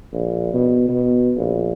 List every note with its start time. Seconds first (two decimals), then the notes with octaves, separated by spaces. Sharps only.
0.13 A#1
0.53 B2
0.89 B2
1.37 A#1